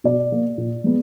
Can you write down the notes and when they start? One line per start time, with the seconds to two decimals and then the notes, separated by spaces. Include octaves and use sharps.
0.04 B2 D5
0.32 A#3
0.58 A#2
0.84 G#3 B3